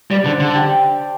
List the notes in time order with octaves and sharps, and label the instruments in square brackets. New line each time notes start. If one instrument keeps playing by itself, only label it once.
[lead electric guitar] G3 [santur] D5
[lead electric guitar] D3 [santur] C5
[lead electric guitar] D3 [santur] A4
[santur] G4